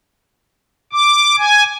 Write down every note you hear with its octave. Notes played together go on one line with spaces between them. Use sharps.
D6
G#5